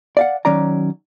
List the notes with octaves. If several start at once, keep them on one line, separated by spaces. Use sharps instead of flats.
D5 F5 F#5
D#3 F#3 C#4 D5 A#5